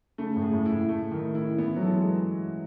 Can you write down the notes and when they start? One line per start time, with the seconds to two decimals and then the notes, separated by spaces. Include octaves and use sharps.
0.18 C#3 A3
0.36 A2
0.42 G#4
0.53 A2
0.66 E4
0.71 A2
0.89 A3
1.11 D#3
1.35 E4
1.58 E3 B3
1.76 F#3
1.82 A4
1.94 G#3